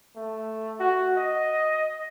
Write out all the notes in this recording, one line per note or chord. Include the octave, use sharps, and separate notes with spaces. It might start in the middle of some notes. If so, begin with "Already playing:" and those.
A3
F#4
D#5